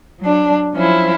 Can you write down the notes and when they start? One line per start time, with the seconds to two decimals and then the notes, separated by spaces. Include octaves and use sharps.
0.20 F#3 D4
0.74 F3 F#3 C#4 E4 C5